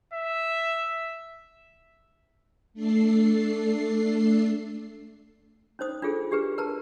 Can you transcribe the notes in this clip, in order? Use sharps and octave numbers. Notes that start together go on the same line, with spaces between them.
E5
A3 D4 A4 C7
C#4 D#4 C5 D#6
D4 F4 G#4 A4
D4 G4 G#4 B4
A#4 B4 A5 A#5